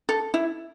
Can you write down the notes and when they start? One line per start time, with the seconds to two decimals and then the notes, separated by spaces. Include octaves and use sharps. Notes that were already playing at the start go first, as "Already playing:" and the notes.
0.09 A4
0.34 E4